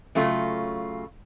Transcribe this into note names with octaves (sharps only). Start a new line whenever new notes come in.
C#3 F#3 A3 F4